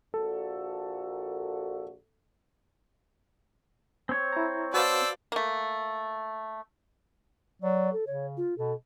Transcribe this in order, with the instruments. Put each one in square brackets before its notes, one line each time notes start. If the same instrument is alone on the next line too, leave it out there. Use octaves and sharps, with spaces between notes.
[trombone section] A#1 A#2 F#4 [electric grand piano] A4
[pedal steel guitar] C4 C#5
[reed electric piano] E4 A#5
[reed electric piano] F#4 B4 F5 [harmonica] C5 D5 A5 [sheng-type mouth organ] E6
[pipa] A3 A#3
[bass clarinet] F#3 [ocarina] D5
[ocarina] A4
[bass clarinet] C#3 [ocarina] C#5
[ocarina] F4
[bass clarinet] B2 [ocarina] A4